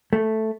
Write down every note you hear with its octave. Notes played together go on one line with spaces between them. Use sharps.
A3